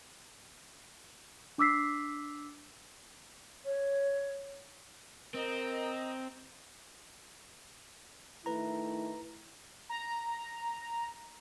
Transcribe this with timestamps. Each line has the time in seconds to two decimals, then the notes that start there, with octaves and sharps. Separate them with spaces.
1.58 D4 D6 E6 B6 C7
3.66 C#5
5.34 C4 A#4 D#5 A#5
8.46 D#3 A3 E4 B4 A#5
9.89 A#5